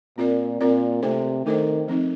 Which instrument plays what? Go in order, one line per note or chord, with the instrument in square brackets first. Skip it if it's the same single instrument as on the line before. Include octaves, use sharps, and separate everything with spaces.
[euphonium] A#2 [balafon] C4 F4 A#4 D5
[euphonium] A#2 [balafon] C4 F4 A#4 D5
[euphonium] C3 [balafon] A3 D4 A4 C5
[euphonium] D#3 [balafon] A3 D4 A4 C5
[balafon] F3 C4 D#4